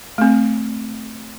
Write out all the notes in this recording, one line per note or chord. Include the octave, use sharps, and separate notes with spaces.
A3 C4